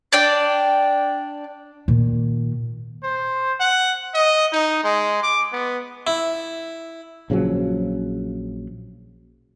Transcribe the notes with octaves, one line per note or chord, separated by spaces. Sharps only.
D4 D5 G5
A#2 D#3
C5
F#5
D#5
D#4
G#3
D6
B3
E4
A#1 C#3 F3 F#3